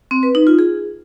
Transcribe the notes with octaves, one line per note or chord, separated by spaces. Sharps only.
C4
B4
D#4
F4
G#4